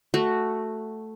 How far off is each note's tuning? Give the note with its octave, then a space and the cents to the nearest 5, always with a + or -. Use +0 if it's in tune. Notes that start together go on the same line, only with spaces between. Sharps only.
A3 +0 F#4 +0